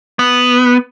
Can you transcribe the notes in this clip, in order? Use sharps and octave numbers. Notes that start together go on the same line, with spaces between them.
B3